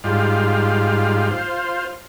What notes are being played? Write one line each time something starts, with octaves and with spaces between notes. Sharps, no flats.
G#2 G3 F4
F4 C5